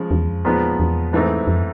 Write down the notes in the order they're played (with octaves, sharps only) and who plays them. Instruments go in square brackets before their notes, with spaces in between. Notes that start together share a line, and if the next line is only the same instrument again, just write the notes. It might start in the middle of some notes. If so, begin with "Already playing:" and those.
Already playing: [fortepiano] C#3 F3 G#3
[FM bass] E2
F2
[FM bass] E2 [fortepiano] A#2 F3 G#3 B3 D#4
[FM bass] E2
[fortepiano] G#2 E3 A3 C4 D#4
[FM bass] F2